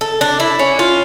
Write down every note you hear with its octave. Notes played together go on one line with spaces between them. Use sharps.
A4
D4
E4
C#4
F4